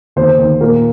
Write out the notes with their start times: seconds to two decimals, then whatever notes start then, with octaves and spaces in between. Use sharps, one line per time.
0.16 D#2 C5
0.39 D#2
0.61 A#2 A#4